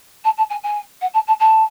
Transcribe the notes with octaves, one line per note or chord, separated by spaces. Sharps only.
A5
A5
G#5
G#5
F#5
A5
A5
A5